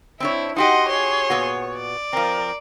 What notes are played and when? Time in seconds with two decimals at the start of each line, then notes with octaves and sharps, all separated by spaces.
0.20 C4 D4 E4 C#5
0.56 D#4 F#4 G4 D#5 F#5 C6
0.89 G#4 C#5 C6
1.30 A#2 B3 F#4
1.76 D5
2.13 F3 C4 A#4